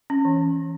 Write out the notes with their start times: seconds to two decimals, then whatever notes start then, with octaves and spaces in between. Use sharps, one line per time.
0.10 C#4
0.25 E3